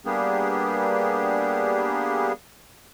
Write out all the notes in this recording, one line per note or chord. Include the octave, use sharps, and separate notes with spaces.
G3 A#3 B3 D4 G4 G#4